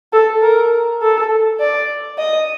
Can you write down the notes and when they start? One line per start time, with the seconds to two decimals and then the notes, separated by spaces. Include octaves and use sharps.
0.13 A4
0.42 A#4
1.02 A4
1.60 D5
2.18 D#5